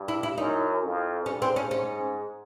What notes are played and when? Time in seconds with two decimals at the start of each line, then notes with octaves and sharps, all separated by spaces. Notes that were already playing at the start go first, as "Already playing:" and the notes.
Already playing: G2
0.08 E4
0.23 E4
0.37 F#2 D#4
0.83 F2
1.26 G2 C#4
1.42 C4
1.56 C#4
1.71 G#2 C#4